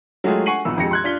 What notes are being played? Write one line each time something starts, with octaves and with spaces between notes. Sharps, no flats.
F#3 G#3 A3 F4 G4 G#4
F#5 G#5 C#6 C7 D#7 F#7
B1 A#2 F3 B3 E6
F2 G#3 G4 A#6 C#7
C6 F#6 G#6
D4 F4 B6 G7